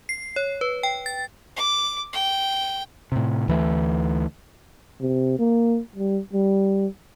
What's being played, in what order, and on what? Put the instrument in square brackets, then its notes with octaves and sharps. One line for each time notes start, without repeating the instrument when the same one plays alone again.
[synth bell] C7
C#5
B4
G5
A6
[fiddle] D6
G5
[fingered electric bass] A2 C3
D2 E3 A3
[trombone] C3
A#3
G3
G3